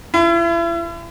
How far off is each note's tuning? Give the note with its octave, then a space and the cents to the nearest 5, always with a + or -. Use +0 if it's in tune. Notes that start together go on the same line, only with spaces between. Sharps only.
E4 +40